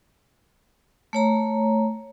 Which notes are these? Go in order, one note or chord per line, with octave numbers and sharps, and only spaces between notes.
A3 C#5 A#5